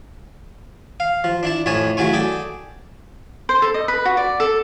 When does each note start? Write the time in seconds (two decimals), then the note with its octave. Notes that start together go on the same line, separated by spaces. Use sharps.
1.00 F5
1.24 F3
1.43 D4 E4 A5
1.66 F2 A2 C#5 G#5 A5
1.97 C#3 F#3 A3 E4 G#5 C#6
2.13 G#4 A4 D5 G5
3.49 C5
3.62 A4
3.74 D#5
3.88 B4
4.05 F#4
4.17 D5
4.40 A4